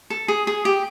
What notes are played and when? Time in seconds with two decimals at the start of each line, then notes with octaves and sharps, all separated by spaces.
0.10 A4
0.28 G#4
0.47 G#4
0.65 G4